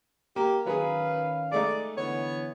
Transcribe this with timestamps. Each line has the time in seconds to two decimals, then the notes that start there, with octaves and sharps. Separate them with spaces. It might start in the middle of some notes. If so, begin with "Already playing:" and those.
0.36 A#3 G4
0.66 D#3 F#3 C#4 G#4 B4 F5
1.52 G#3 A3 D#4 D5
1.97 D3 E3 B3 C#5